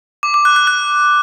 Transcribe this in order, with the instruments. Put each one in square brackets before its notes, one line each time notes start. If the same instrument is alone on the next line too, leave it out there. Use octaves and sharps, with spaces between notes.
[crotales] D6
D6
F#6
F#6
F#6